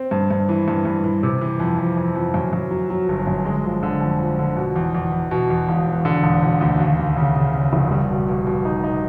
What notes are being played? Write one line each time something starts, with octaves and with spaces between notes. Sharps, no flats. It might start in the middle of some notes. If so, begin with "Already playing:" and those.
Already playing: C4
G2
G2
E3
G2
G2
E3
C3
E3
F2
F2
F2
F2
F#2
F#2
F#3
F#3
G1
F#2
G#3
F3
D3
F2
F3
D3
B2
E2
E2
E2
B2
E2
E1
E1
D3
E1
E1
D2
D#2
D#2
C#3
C#3
C#3
F1
G3
B2
B2
B2
D#4
D#4